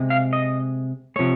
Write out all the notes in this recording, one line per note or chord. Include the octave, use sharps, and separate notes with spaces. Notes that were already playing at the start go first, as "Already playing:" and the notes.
Already playing: C3 G#3
F5
D#5
C3 F3 G#3 C#5